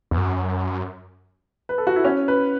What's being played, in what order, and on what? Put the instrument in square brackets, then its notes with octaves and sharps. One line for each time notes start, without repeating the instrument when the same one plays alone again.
[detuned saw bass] E2
F#2
[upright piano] B4
A4
F#4
E4
C#4
B4